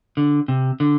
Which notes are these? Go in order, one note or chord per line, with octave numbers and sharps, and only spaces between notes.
D3
C3
D3